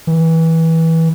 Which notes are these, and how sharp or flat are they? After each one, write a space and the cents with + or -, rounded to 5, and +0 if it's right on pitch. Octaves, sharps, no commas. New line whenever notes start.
E3 -20